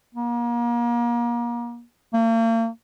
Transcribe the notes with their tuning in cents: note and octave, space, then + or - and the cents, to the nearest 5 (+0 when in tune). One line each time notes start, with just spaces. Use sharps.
A#3 +35
A#3 -40